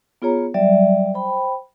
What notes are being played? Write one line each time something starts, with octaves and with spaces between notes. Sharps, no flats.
B3 F4 G#4 C#5 A#5
F#3 G3 D5 E5
C5 G5 B5